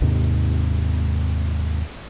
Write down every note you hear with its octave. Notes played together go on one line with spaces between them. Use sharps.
D#2 G#2 C3